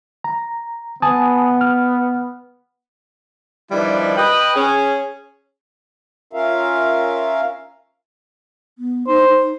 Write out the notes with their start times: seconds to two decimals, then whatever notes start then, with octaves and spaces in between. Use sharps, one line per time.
0.24 A#5
1.02 B3 G#5 A5 D#6
1.61 F6
3.71 D#3 F3 G3 D4 E4 B4
4.17 B4 D#5 G5
4.55 C#4 G#4
6.33 C#4 F4 A#4 E5 F5
8.79 B3
9.07 D#4 C5
9.28 D#4